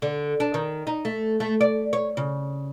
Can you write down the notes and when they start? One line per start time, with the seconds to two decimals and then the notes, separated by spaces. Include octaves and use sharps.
0.02 D3
0.40 D4
0.54 D#3
0.87 D#4
1.05 A3
1.40 A3
1.61 D5
1.93 C#5
2.17 C#3